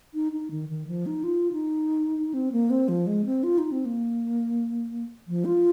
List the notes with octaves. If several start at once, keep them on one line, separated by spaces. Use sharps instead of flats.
D#4
D#4
D#3
D#3
F3
D#4
F4
D#4
C4
A#3
C4
F3
G#3
C4
F4
D#4
C4
A#3
F3
F4